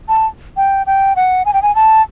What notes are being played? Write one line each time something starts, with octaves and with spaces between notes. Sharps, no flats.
A5
G5
G5
F#5
G#5
G5
G#5
A5